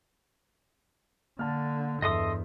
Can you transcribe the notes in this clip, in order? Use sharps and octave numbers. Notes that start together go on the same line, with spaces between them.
D3 A#3 A5 F6
E2 G2 A4 D#5 E5 C6 D#6